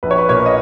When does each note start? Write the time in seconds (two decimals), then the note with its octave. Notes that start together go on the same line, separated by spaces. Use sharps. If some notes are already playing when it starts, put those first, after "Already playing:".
0.03 A#1 B4
0.11 C#5
0.18 B4
0.29 A#2 A#3 C#5
0.46 D#5